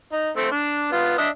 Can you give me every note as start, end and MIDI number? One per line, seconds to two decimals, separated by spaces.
0.12 0.29 63
0.37 0.47 57
0.37 0.47 60
0.52 0.92 62
0.92 1.16 59
0.92 1.16 65
1.18 1.28 62
1.18 1.28 75
1.18 1.28 76